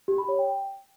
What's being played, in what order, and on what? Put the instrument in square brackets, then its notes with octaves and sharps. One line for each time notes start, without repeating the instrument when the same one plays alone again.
[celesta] G4
B5
C#5
G5